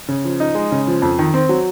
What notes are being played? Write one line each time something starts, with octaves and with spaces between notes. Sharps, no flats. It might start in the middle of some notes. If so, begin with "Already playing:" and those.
C#3
F3
D#4
G#3
C#3
F3
F2
D#3
C4
F#3